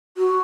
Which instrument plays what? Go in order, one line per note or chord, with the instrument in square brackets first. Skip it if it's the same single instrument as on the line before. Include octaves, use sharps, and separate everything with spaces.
[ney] F#4